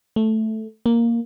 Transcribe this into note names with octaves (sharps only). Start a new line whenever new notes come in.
A3
A#3